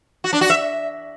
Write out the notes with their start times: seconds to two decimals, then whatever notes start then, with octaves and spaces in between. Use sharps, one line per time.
0.24 F#4
0.33 D4
0.41 F#4
0.50 E5